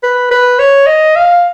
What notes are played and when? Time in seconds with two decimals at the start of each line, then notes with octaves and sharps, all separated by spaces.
0.03 B4
0.31 B4
0.59 C#5
0.87 D#5
1.16 F5